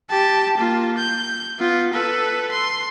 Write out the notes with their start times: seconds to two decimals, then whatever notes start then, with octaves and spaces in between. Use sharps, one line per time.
0.10 G4 A5
0.57 A#3 F4
0.98 G6
1.59 B3 F4
1.94 A4 B4
2.51 C6